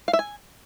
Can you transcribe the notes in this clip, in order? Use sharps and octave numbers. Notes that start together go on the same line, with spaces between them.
F5
E5
G#5